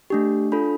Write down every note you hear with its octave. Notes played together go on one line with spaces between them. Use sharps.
A3 D4 G4
D4 F4 A4 B5